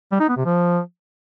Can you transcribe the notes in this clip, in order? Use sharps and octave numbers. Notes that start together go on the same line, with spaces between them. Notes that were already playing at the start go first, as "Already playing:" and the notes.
G3
D#4
B3
C3
F3